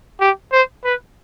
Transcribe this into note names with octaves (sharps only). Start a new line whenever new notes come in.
G4
C5
B4